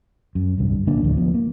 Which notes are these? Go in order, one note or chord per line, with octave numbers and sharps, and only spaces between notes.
F#2
D1 C2 G2
A#1 D3 A#3 D4
A1 D2 C3 F3
F3 B3
A#3